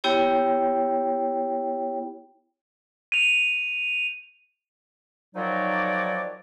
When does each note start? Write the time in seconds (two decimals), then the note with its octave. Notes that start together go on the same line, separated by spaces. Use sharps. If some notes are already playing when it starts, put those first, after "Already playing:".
0.04 B3 E4 G4 C#5 G5
3.12 D#7 F7
5.35 D#3 F3 F#3 D#4 F#4 D5